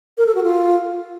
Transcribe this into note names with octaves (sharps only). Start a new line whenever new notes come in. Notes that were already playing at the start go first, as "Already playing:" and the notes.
A#4
A4
F#4
F4